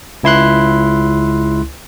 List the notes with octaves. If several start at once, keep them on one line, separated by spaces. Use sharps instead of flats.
C#2 E4 C6 F#6